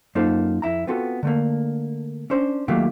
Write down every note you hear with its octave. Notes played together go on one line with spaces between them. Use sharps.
F#2 A#3 D#4 F4 A4 C5
F2 E4 A#5
B3 C4 F4 F#4 A4
D3 A3 A#3
C#4 D4 C5
D#3 F#3 A3 A#3 F4 G4